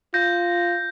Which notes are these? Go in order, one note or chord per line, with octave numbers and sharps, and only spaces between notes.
F4 G6 A#6